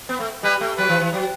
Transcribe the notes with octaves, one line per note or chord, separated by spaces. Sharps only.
B3
A3
G3 B4
A3
F#3 B4
E3
E3
F#3